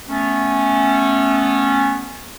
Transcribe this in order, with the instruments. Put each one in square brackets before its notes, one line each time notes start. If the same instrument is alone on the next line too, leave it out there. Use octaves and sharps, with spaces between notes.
[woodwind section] A3 B3 C#4